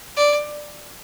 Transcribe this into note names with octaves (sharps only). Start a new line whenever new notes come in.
D5